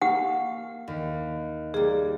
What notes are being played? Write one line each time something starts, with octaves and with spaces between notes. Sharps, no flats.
A#3 G4 F#5
D#2
G3 A#3 G#4